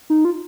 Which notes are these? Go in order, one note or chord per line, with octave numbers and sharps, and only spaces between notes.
D#4
F4